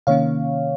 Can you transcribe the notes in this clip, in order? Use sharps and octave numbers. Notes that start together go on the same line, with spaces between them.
C3 D#3 A#3 C#4 C#5 F5